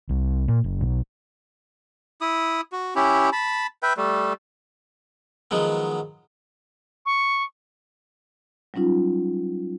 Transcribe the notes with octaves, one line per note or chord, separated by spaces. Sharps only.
C2
A#2
F#1
B1
E4 D#6
F#4
C#4 E4 G4
A5 B5
B4 E5 G5
G3 A3
D#3 F3 F#3 G#3 B3
C#6
F#3 G3 C#4 D#4 F4